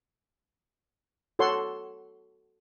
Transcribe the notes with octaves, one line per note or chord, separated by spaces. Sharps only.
F#4 A4 C#5 F#5 C6